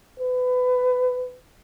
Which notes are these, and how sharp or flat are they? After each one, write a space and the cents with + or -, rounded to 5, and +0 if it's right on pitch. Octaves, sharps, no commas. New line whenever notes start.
B4 +25